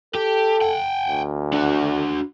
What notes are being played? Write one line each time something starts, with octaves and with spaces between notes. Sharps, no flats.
G4 A4
F#5 G5
D2
D4 F#4